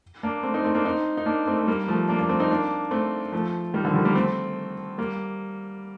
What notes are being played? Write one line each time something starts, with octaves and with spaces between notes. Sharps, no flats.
A#3 D4
A3 C4
C4 D#4
A3 C4
A#3 D4
C4 D#4
D#4
A#3 D4
A3 C4
A3
G3 A#3
F3 A3
A#3 D4
A#3 D4
A3 C4
C4 D#4
A#3 D4
A3 C4
F3 A3
D#3 G3
D3 F3
D#3 G3
G3 A#3
A3 C4
G3 A#3